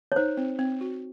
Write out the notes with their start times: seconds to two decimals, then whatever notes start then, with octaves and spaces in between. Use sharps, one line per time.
0.12 C#5
0.16 D#4 C5
0.37 C4
0.59 C4
0.81 F#4